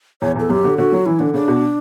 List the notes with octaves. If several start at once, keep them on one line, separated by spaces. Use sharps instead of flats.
E2 C#5
E2 A4
F#2 G4
D3
D3 F#4
F#3
E3 E4
D3 D4
C#3 D4
B2